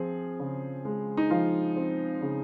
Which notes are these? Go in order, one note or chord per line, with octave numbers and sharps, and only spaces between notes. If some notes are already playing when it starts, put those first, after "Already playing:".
Already playing: F3 C4 G#4
C#3
G#3
D#4
F3 F4
C4
C#3